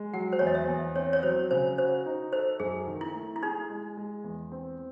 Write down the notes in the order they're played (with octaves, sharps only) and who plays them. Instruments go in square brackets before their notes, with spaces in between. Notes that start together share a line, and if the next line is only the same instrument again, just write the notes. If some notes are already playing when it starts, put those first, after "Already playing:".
Already playing: [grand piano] G#3
[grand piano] F#3 [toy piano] F#5
[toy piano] C5
[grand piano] E2 [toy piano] C#5
[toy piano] D#5
E5
[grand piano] E2
[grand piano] C4 [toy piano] C#5
[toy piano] C#5
[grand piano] F#3 [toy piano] C5
[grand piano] C#3 [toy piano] C5
[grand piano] F#4 [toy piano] C5
[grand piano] D#4
[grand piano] A4 [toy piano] C5
[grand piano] F#2 [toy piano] G#4
[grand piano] D#3
[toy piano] E4
[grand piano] A3
[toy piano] E4
[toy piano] D#4 [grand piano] G#4
[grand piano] G#3
G#3
E2
C4